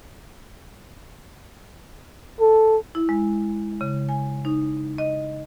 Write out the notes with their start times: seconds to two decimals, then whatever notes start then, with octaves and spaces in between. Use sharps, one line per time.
2.41 A4
2.95 E4
3.09 G#3
3.81 C#3
4.09 G#5
4.45 D#4
4.98 D#5